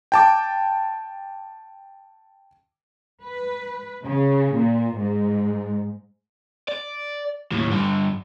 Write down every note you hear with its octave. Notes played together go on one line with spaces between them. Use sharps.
G5 A5 D6
B4
C#3
A#2
G#2
D5
D#2 A2
G2 D3